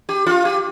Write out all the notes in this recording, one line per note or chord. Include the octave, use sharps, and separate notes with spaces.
G4
F4
G4